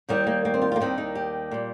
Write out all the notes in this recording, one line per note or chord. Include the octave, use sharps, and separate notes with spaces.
D#2 D#3 G3 D#4
A#3
A#3
C4
F4
A#3 F4
D#2 D#3 G3 C4
D#4
G4
A#2 G3